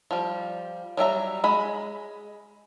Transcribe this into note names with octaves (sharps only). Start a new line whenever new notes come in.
F3 G3
F#3 G3 E5 A#5
G#3 B5